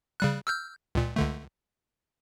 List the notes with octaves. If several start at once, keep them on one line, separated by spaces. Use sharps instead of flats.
C#3 G3 F#6
E6 F6 G6
C#2 A#2
C#2 D3 A3